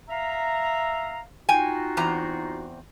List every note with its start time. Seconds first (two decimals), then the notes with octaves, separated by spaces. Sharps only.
0.10 E5 F5 A#5
1.49 D#4 F4 F#4 G5 G#5
1.97 E2 C4 A#5